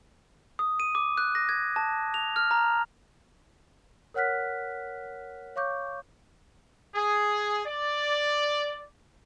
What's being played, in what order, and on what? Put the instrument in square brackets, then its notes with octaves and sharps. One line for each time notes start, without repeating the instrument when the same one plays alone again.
[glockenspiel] D#6
D#7
D6
F#6
A#6
G#6
A5
F7
F6
A#5
[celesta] A#4 C#5 F#5 F6 F#6 B6
C#5 F5 C#6 D6 G6
[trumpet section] G#4
D5